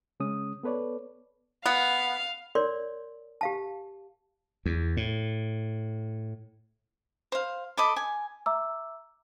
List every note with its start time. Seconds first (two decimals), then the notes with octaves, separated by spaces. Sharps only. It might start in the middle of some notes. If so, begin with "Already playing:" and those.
0.20 C#3 G#3 C#4 D#6
0.63 B3 A4 B4 C#5 D5
1.66 B3 F5
2.55 A#4 C#5 D5 C6
3.41 G4 F5 A5
4.66 E2
4.97 A2
7.32 C5 F5
7.77 A4 D#5 B5 D6
7.96 G#5
8.46 E5 A#5 D6 E6